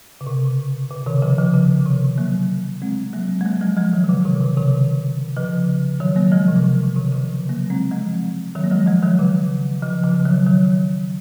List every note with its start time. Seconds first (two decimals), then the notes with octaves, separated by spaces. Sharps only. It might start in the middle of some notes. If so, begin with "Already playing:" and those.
0.21 C#3
0.27 C3
0.91 C#3
1.07 C3 D#3
1.22 C#3 F3
1.38 C#3 F3
1.54 C#3
1.86 C3 D#3
2.18 F#3 A#3
2.82 G#3 C4
3.13 F#3 A#3
3.41 G#3
3.45 F#3 A#3
3.61 F3 G#3
3.77 F3 G#3
3.93 D#3 F#3
4.04 D#3
4.09 C#3
4.25 C3 D#3
4.41 C#3
4.57 C3 D#3
5.36 C#3 F3
6.00 D#3 F#3
6.16 F#3 A#3
6.32 F3 G#3
6.48 C3
6.56 C#3
6.64 C3
6.96 C3 D#3
7.12 C#3 F3
7.49 F#3 A#3
7.70 G#3 C4
7.91 F3 G#3
8.55 D#3 F#3
8.64 A#3
8.71 F3 G#3
8.87 F3 G#3
9.03 D#3 F#3
9.19 C#3
9.82 C#3 F3
10.04 C#3 F3
10.25 D#3 F#3
10.47 D#3 F#3